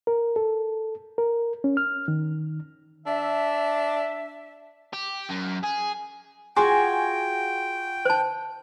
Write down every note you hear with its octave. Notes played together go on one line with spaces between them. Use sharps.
A#4
A4
A#4
C#4
F6
D#3
D4 E5
G4
F#2
G#4
F4 F#4 G#4 G5 G#5 D6
C5 A5